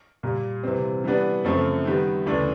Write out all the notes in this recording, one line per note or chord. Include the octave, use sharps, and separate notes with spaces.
A#2 G3 A#3
C3 E3 G3 C4
E3 G3 B3 D4
F#2 C#3 F3 A3 C4
D#3 G3 B3
D2 C#3 E3 A3 D4